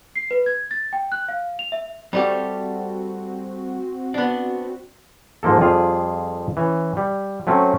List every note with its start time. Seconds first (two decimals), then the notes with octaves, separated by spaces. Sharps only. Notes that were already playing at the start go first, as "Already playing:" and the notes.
0.16 C7
0.31 B4
0.46 G#6
0.71 A6
0.93 G5
1.12 F#6
1.29 F5
1.59 F7
1.72 E5
2.13 G3 A3 C4 F#4 G4
4.14 B3 D4
5.43 G#2 F3 A#3 A4
5.60 F2 G3 F4 G#4 F5
6.57 E3 C#4
6.97 G3
7.47 F#3 A3 C4 C#4